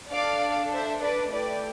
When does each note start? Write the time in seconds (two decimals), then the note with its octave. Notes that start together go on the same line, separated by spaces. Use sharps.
0.11 D4 A4 D5 F5
0.71 C5 E5
1.01 B4 D5
1.31 A3 E4 G4 B4 D5